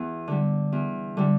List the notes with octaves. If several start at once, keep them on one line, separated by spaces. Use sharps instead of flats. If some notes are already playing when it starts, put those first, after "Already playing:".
Already playing: E2
D3 G3
E2
D3 G3